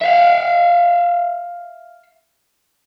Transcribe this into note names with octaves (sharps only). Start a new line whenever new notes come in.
E5 F5